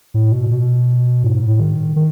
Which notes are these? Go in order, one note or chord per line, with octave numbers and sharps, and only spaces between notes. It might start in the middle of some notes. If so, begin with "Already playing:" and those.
A2
B2
B2
G#2
A2
D#3
D#3